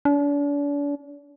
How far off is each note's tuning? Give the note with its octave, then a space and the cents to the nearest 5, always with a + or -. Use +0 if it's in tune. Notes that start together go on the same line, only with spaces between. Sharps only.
D4 -40